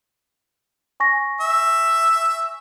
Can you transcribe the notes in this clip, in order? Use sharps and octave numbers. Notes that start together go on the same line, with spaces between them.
G#5 C#6 A#6
E5